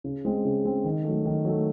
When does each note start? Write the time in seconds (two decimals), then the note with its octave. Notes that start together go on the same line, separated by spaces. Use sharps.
0.04 C#3
0.25 G#3 C4
0.45 C#3
0.65 G#3 C4
0.84 D#3
1.04 F#3 A3
1.25 D#3
1.45 F#3 A3